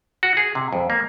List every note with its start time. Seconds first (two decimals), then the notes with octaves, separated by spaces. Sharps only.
0.23 F#4
0.37 G#4
0.55 C3
0.73 F2
0.90 A#3